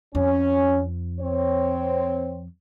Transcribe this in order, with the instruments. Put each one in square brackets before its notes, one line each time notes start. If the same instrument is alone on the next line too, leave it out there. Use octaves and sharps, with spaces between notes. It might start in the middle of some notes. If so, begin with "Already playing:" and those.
[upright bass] F2 [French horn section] C#4
[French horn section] C4 C#5